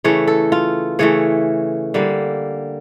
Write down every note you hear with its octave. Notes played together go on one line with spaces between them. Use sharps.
C#3 E3 A3 C#5
A4
F4
C#3 E3 A3 C#5
D3 G3 A#3